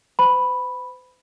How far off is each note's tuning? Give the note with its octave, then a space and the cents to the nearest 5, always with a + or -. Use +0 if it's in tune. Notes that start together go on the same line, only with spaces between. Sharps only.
C5 -45 B5 +0